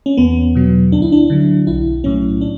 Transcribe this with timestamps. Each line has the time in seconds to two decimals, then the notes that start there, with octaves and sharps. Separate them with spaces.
0.06 C#4
0.17 E2 B3
0.55 B2 F#3
0.92 D2 D4
1.02 E4
1.12 D4
1.30 D3 F#3
1.67 B1 E4
2.04 A2 F#3 C#4
2.41 D4